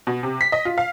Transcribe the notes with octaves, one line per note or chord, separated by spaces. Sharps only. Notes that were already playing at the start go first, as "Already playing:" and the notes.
B2
C3
B6
D#5
F4
F5